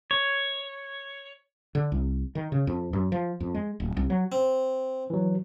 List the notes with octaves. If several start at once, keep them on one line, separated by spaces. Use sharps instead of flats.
C#5
D3
C2
D#3
C#3
F2
F#2
F3
F2
G#3
D1
C2
F#3
C4
E3 F#3